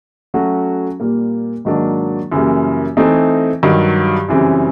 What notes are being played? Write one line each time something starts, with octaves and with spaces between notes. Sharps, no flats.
F#3 A3 C#4 F#4
A#2 G3 A#3
G#2 D#3 F#3 A#3 D4
F#2 C#3 E3 G3 A#3
E3 A3 C4 D#4
G2 D#3 F#3
F#2 C#3 E3 G3 C4